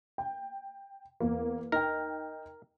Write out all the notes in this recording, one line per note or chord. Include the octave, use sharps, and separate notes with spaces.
G5
E2 A#3
D#4 A#4 G5